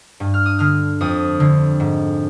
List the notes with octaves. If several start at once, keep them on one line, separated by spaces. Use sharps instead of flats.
G2
F6
D#6
D3 F6
F2 D#6
D3
G#2